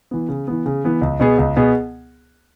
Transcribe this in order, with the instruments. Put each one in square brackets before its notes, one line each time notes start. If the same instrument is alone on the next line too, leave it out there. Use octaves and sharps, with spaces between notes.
[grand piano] E3 B3
C#3
E3 B3
C#3
E3 B3
C#2
B2 B3 G#4
C#2
B2 B3 G#4